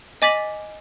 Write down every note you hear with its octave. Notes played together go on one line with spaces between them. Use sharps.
D#5 G#5 D6 A6 B6 F#7